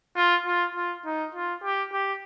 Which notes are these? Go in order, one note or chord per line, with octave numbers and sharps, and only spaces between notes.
F4
F4
F4
D#4
F4
G4
G4